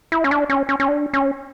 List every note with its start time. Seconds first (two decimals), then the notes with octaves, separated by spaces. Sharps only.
0.12 E4
0.24 C#4
0.31 D4
0.49 C#4
0.69 C#4
0.80 C#4
0.88 D4
1.14 C#4